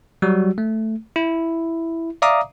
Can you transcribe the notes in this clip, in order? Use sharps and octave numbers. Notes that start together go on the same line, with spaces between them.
F#3 G3 F#4
A3
E4
D5 E5 F5 A#5 D6 D#6